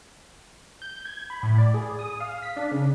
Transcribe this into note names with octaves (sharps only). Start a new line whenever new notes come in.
G6
G#6
B5
A2
D5
G#4
D#6
F5
B6
D4
C#3